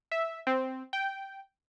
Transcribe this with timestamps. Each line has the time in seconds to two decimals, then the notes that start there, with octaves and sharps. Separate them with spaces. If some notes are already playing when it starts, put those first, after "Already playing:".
0.12 E5
0.47 C4
0.93 G5